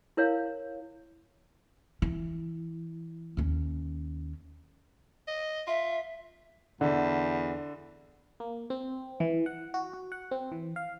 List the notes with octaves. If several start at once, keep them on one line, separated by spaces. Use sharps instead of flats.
E4 A#4 C#5 F5
E3
D#2 C#4
D#5
F4 E5
E2 D3
A#3
C4
E3
F#5
F#4
F#4
F#5
C4
E3
F5